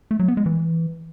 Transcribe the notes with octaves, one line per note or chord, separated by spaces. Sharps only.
A3
F#3
B3
G#3
E3